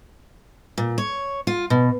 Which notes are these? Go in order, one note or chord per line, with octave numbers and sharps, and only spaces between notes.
A#2
C#5
F4
B2